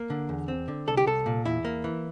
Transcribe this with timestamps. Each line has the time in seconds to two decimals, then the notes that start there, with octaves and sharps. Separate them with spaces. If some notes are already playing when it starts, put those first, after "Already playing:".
Already playing: A#3 A#4
0.10 D3
0.29 E2
0.48 C4
0.68 D3
0.87 C2 A4
0.97 G4
1.07 C2 A4
1.26 A#2
1.45 E2 E4
1.65 A#3
1.84 E3